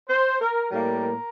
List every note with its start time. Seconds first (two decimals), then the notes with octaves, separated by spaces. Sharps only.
0.09 C5
0.40 A#4
0.71 A2 G3 A#3 A#4